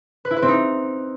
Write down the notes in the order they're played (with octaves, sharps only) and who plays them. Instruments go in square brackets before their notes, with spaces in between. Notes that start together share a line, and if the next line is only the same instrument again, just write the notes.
[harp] B4
E4
B4
C4
D#4